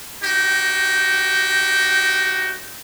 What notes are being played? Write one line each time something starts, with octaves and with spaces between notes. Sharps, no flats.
D#4 F#4 G4 G5